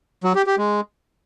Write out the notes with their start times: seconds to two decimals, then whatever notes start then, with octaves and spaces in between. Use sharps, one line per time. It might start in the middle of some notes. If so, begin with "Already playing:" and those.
0.24 F#3
0.35 G4
0.47 G4
0.58 G#3